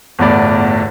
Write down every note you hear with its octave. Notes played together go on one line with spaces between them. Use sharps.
G1 E2 A2 D5